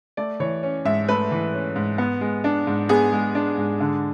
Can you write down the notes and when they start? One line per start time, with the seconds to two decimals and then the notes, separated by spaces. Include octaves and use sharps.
0.17 A3 D5
0.40 E3 C#5
0.63 C#4
0.85 G#2 E5
1.08 A3 B4
1.31 E3
1.54 C#4
1.76 G#2
1.98 B3
2.21 G#3
2.44 D4
2.67 G#2
2.89 B3 G#4
3.13 G#3
3.35 D4
3.58 G#2
3.80 D3